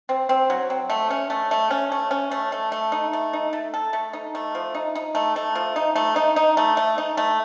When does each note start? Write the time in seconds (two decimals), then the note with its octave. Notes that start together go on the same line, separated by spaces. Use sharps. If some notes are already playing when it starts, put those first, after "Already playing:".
0.09 C4
0.29 C4
0.50 F#3
0.70 C4
0.90 A3
1.10 C#4
1.30 A3
1.51 A3
1.71 C#4
1.92 A3
2.11 C#4
2.31 A3
2.52 A3
2.72 A3
2.92 D#4
3.13 A3
3.33 D#4
3.53 A3
3.74 A4
3.93 A3
4.13 D#4
4.35 A3
4.55 F3
4.74 D#4
4.95 D#4
5.15 A3
5.36 A3
5.55 F3
5.76 D#4
5.96 A3
6.16 D#4
6.36 D#4
6.57 A3
6.77 A3
6.98 D#4
7.17 A3